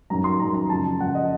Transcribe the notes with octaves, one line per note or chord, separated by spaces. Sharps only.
F#2 D#3 F#3 A#5
C6
F#2 D#3 F#3 A#5
A#5
F#2 C#3 F3 A5
F#2 C#3 F3 F#5
D#5